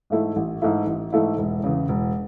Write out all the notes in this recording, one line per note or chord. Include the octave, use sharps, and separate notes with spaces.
G#2 E3 A3 E4
A1
G#2 E3 A3 E4
A1
G#2 E3 A3 E4
E1
E2 C#3
E1